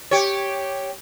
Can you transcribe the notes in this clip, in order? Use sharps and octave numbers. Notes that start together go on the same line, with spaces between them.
G4 C#5